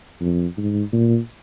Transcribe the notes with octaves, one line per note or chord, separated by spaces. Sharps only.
F2
G#2
A#2